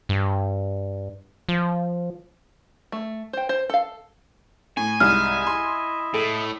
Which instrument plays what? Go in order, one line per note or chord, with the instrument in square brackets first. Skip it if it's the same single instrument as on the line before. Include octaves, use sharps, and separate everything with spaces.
[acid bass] G2
F3
[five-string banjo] A3
C5 G5
C5
A4 F5
[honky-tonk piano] A2 [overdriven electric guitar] G#5
[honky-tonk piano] C2 G#2 [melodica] E4 D#5 E5 [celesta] F6
[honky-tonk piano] C6
[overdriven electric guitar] A2 [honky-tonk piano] A4